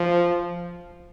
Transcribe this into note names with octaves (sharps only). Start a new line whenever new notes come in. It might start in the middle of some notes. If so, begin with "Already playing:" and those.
Already playing: F3